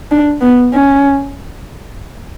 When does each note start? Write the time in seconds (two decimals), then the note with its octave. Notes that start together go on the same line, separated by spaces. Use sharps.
0.11 D4
0.41 B3
0.74 C#4